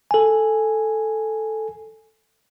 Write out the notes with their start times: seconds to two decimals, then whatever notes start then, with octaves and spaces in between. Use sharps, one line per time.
0.11 A4 G#5